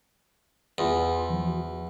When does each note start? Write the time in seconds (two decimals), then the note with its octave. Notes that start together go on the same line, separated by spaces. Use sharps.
0.78 E2 F4 C6
1.30 E3 F3
1.48 F#4